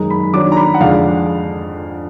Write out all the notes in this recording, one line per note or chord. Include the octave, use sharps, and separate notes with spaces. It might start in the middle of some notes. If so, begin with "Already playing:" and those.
Already playing: F#2 D#3 G#3 D#4 A#5
B5
D#3 F#3 D4 D6
A#5
B5
F#5
F2 D3 G#3 D4 F5